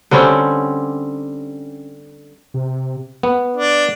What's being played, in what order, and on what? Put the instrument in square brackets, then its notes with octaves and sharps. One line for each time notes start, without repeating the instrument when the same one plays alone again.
[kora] D3 G3 C4 C#4
[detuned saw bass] C3
[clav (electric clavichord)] B3
[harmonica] D4